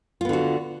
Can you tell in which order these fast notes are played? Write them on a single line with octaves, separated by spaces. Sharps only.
F4 B3 D3 F#4